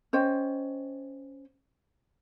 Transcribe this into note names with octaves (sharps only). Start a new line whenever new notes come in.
C#4 C5 D#5 G5